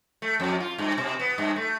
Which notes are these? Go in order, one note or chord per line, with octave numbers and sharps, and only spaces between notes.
A3
F2
F4
G2
B2
B3
G2
A3